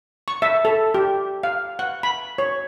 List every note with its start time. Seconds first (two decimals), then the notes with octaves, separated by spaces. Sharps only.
0.28 C#6
0.42 E5
0.65 A4
0.94 G4
1.43 F5
1.79 F#5
2.03 B5
2.38 C#5